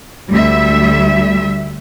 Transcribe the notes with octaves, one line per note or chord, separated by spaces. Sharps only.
D2 G3 E5